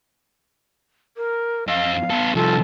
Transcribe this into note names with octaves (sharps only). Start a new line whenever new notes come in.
A#4
F2 D#5 F5
B3 A4
C2 F3 A4